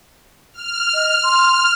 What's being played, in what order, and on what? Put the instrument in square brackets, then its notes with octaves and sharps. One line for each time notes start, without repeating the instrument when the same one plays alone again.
[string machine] F6
[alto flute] D#5
C6